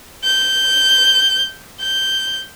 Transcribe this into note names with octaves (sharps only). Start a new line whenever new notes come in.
G6
G6